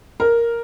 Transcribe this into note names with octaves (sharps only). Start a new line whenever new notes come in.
A#4